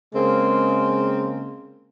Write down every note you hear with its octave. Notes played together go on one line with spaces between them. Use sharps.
C#3 G#3 A#3 C4